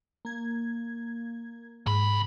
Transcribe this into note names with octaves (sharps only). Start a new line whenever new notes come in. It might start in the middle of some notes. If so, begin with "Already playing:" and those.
A#3 G#6
G#2 C3 B5